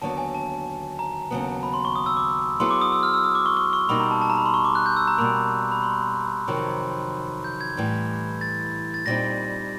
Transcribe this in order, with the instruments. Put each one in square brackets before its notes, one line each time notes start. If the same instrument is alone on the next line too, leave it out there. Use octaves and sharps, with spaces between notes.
[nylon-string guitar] D#2 D3 F#3 B3 [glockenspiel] A5
[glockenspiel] G#5
A5
A#5
[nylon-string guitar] D#2 C#3 F#3 B3
[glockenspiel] B5
C6
C#6
D#6
E6
D6
[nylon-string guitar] F#3 B3 E4 G#4 [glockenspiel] C6
[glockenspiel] D6
D#6
E6
F6
E6
D#6
D6
C#6
C#6
C#6
[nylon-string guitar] B2 G3 A#3 D#4 [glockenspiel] B5
[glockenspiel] A#5
A5
A5
A#5
B5
C6
C#6
D6
F#6
G6
E6
A#5
[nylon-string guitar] B2 G3 A#3 [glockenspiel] B5
[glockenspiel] B5
C6
[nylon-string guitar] F2 C3 D#3 F#3
[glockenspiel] G6
G#6
[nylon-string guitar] A2 E3 G3
[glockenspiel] A6
A6
[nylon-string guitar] A#2 G3 C4 D#4 [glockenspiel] A#6